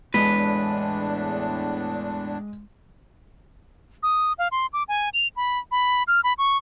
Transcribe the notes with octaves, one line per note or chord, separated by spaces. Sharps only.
E2 A2 G#3 D4 B4
D#6
F5
C6
D6
G#5
F7
B5
B5
F6
B5
C#6